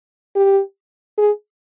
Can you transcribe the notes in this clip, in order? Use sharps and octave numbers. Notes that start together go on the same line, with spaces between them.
G4
G#4